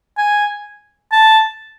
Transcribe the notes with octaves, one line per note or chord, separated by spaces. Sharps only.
G#5
A5